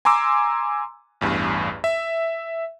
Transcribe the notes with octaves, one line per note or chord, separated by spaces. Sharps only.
G#5 A#5 C6 D6 E6
A1 E2 G2
E5